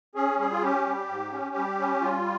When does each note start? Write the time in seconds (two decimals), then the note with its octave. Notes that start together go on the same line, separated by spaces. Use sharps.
0.15 C#4 G#4
0.38 G3 G#4
0.52 F4
0.62 C#4 G4
0.86 G3
1.09 G#2
1.32 C#4
1.56 G3
1.79 C#4
2.02 G3 F4